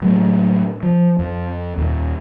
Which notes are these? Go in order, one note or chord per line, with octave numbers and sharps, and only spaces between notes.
A2 F#3 G#3 A3
F3
F2
D#2 A#2